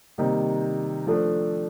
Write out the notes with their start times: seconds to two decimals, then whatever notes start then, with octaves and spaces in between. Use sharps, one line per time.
0.18 C3 D#3 G3 A#3 D#4
1.07 F3 A3 D4 A4